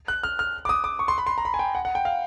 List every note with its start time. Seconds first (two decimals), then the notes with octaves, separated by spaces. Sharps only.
0.08 F#6
0.23 F6
0.39 F6
0.65 D6
0.69 D#6
0.84 D6
0.99 C#6
1.08 C6
1.18 B5
1.27 C6
1.38 A#5
1.45 B5
1.54 G#5
1.59 G5
1.75 F#5
1.85 F#5
1.95 G5
2.05 F5